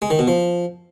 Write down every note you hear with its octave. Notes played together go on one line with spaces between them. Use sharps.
G#3
D#3
B2
F3